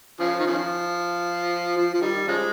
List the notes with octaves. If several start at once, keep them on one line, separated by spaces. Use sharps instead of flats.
C#3 F3
D#3
C#3 F3
F3
F3
D#3 G3
C#3 F3 G#3